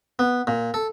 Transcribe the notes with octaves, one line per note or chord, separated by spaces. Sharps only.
B3
A#2
A4